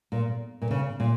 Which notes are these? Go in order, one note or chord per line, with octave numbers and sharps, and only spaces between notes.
A#2
A#2
C#3
A#2